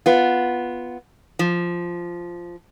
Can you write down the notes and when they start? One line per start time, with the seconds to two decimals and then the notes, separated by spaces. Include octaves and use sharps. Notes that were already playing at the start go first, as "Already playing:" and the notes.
0.06 B3 F4
1.39 F3